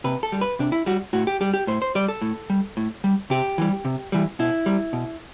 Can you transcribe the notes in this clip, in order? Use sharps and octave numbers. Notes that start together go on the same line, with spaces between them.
C3 B4
A4
G3
B4
C3 D4
E4
G3 F#4
A2 F#4
G4
G3 G4
G4
A2 C5
C5
G3 D5
A4
A2
G3
A2
G3
C3 G4
E3 G3
C3
E3 G3
B2 E4
G3
B2